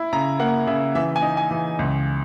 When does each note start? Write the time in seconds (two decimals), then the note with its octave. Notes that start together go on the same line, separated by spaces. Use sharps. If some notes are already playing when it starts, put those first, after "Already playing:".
Already playing: E4
0.13 C#3 A#5
0.39 A#3 F#5
0.67 C#3 E5
0.95 E3 E5
1.16 G#5
1.22 D#4
1.37 G#5
1.51 E3
1.79 C#2